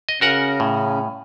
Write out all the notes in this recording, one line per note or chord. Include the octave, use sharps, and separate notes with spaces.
D#5
C#3 C#4 F#4 A#4 F#5
A2